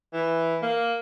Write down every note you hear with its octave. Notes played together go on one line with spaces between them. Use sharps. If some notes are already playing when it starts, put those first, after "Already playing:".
E3
A#3